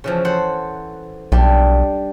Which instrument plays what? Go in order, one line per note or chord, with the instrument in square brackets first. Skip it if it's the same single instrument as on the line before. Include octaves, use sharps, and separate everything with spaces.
[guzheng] C#3 E3 F3
A4 C5 F#5
[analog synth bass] B1 [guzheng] G3 D4